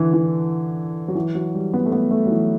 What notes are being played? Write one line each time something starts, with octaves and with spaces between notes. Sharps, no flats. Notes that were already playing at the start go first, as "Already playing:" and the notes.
Already playing: D3 E3
E3
F#3
E3
F#3
G3
B3
A3
B3
A3
F#3
E3